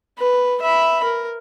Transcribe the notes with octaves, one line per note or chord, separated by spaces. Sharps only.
B4
E5 B5
A#4